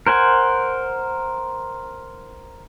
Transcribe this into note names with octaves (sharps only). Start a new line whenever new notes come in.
A#4 C5 F#5 G#5